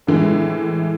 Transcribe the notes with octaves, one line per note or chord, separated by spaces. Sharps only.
A2 E3 G#3